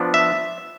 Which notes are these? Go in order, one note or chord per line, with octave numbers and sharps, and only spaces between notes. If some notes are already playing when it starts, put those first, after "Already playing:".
Already playing: F3 B3 D4
E5